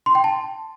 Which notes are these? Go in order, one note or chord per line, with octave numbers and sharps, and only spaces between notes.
C6
G5
A5